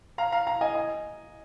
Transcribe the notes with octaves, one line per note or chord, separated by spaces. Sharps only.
F5 A#5
F5 A#5
F5 A#5
D#5 G#5
D#5 G#5